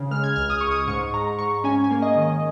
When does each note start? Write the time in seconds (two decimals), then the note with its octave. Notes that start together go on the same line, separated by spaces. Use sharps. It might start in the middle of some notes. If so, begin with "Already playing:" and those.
Already playing: C#3
0.11 G#3 F6
0.24 G#6
0.36 C#2 F6
0.50 D#6
0.61 C#2 C#6
0.71 D#6
0.88 G#2 C#6
1.14 G#2 A#5
1.39 G#2 C#6
1.64 C#4 G#5
1.84 G#5
1.90 A#3
2.02 D#5
2.16 D#3
2.22 D#5